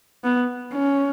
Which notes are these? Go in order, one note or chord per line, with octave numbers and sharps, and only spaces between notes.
B3
C#4